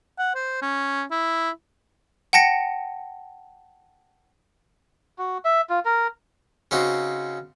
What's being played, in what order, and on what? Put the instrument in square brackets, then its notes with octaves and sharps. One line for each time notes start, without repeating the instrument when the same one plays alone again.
[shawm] F#5
C5
C#4
E4
[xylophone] F#5 G5 A5 A#6 C#7
[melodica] F#4
E5
F4
A#4
[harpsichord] C#3 C4 D#4 F#4